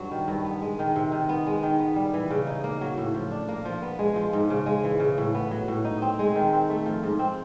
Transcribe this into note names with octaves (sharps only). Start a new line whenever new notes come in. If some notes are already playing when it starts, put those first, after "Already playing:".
Already playing: G2 F#3
D#3
G2
B3
G#3
D#3
C3
D#3
B3
G#3
D#3
B3
G3
E3
C#3
D#4
A#3
F#3
A2
F3
D4
A#3
F3
B3
G#3
F3
G#2
C#3
G#3
E3
C#3
A2
B3
F#3
A2
D#4
C4
G#3
D#3
C4
A3
F3
G#2
C4